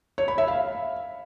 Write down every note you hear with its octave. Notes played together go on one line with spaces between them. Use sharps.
C#5
B5
E5
F5